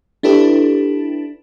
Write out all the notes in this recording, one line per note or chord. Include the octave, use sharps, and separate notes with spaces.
D4 E4 G4 A4 B4